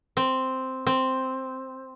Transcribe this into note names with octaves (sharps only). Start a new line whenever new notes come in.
C4
C4